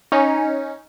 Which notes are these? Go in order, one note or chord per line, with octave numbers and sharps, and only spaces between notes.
C#4 D#4